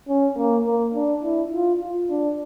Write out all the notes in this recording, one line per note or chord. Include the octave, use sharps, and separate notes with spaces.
C#4
A#3
A#3
D4
E4
F4
F4
D4